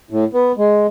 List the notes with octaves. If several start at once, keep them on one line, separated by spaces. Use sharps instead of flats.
A2
B3
G#3